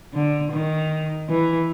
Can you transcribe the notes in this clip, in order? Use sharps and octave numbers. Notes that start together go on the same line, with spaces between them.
D3
D#3
E3